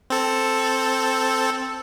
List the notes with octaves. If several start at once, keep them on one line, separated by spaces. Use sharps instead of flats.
C4 A4